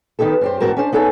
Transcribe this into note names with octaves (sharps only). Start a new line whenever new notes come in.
D#3 B3 D#4 G4 A4
F#2 G4 C5
E2 G#2 C4 F#4 A#4 A5
C#4 D4 C5
B3 D#4 A4 C#5 G#5